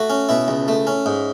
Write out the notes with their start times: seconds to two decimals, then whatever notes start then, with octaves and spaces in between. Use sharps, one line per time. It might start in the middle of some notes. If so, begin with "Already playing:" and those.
Already playing: A3 F#4
0.10 C#4
0.29 B2 E4
0.48 C#2
0.68 A3
0.87 C#4
1.06 G#2